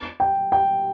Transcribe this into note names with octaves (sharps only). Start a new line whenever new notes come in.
G5
G5